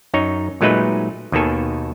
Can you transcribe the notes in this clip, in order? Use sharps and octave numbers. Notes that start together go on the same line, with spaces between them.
F#2 D#4 C#5
A#2 F#3 G#3 A3 D#4 B4
D#2 B2 D#3 A4 G#5